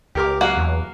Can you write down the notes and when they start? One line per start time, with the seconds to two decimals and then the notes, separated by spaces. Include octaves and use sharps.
0.15 C#2 G4 A#4 D6
0.41 F#3 A#3 F5 F#5
0.56 E2